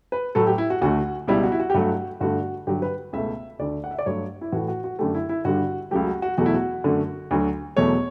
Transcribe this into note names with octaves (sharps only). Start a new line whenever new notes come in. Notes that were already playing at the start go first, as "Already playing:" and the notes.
B4
A2 F#3 A3 A4
G4
E4
F#4
D2 D3 A3 F#4
C#2 B2 G3 E4
F#4
E4
F#4
G4
G2 F#3 A3 F#4
G2 D3 A3 F#4
G2 D3 F#3 G4
B4
C#2 B2 A3 E5
D2 D3 A3 D5
F#5
E5
D5
G2 F#3 A3 C#5
E4
A2 E3 A3 F#4
F#4
F#4
F#2 D3 A3 G4
E4
E4
G2 D3 G3 F#4
C#2 C#3 F#3 A3 G4
F#4
F#4
E2 B2 F#3 A3 F#4
E4
F#4
F#2 D3 A3
D2 D3 F#3
E2 B2 F#3 A3 C#5